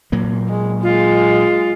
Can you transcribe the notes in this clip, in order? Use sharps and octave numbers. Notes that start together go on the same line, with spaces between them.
A#2 F#3 A#3
G#3
G#3 F4